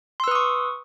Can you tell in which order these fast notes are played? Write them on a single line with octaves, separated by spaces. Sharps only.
C6 E6 B4 D#6 C#6